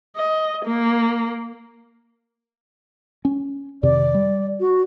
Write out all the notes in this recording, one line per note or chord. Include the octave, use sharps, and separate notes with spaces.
D#5
A#3
C#4
F2 C3 D#3 D5
G3
F#4